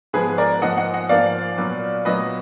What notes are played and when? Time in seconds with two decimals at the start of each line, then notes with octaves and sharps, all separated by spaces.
0.13 G#2 F3 G#3 B3 G#4 B4
0.38 A#4 D5
0.62 G#2 F3 A#3 D#5 F#5
0.77 D#5 F#5
0.94 D#5 F#5
1.09 G#2 F3 A#3 D5 F5
1.57 A#2 F#3 B3
2.05 A#2 F#3 B3 B4 D#5